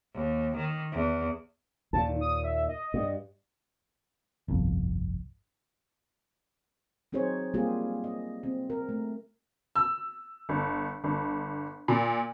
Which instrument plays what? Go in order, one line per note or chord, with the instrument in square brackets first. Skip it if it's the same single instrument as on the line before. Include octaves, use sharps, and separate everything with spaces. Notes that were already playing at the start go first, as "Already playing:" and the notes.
[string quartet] D#2
D#3
E2
[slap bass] D#2 A#2 [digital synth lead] A5
[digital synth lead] D#3
D#6
E5
D#5
[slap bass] G2
[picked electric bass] G1 C2 F2
[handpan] F#3 C4 D#4 G#4 C5 C#5
G3 A#3 C4 F4 G4 G#4
D#5
C4
A#4
A3
[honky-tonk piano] E6
G1
G1
A#2